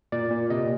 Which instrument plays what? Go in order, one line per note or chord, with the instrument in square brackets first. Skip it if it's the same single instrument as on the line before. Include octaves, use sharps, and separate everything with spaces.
[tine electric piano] A#2 D5
A#2
C3 D#5